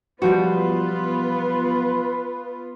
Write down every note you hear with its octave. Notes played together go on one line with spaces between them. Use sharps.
B1 F3 G3 B3 F4 F#4 B4